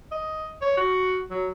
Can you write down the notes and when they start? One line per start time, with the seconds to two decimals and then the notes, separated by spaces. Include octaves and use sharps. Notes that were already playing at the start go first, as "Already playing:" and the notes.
0.12 D#5
0.62 C#5
0.77 F#4
1.30 F#3